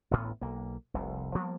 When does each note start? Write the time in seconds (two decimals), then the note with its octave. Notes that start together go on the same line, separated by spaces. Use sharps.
0.11 A1 D2 A2 B3
0.41 B1 A#3
0.94 F1 C2
1.35 F3 G3 A#3 B3